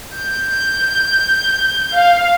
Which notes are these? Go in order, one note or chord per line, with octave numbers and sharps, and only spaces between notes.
G6
F5